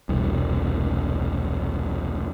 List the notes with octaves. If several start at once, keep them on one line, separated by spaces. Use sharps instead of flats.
E1 C2